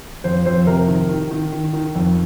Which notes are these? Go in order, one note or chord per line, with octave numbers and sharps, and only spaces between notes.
F2 C5
F2 C5
C3 A#4
D#3
D#3
D#3
D#3
D#3
F2